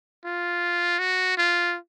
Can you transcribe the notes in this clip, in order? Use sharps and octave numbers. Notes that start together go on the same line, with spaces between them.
F4
F#4
F4